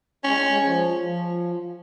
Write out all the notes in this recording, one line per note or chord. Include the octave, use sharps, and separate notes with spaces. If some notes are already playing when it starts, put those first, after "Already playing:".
G#3 C#4
G#3
F3
F3